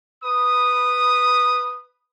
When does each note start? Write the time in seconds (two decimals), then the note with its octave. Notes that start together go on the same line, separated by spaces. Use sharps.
0.24 B4 B5 D#6